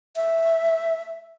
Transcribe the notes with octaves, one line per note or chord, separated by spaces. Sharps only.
E5